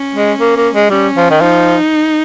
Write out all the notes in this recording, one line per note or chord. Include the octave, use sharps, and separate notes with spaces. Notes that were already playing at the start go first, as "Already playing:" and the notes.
Already playing: C#4
G#3
A#3
A#3
G#3
G3 C#4
F3
D#3
F3 D#4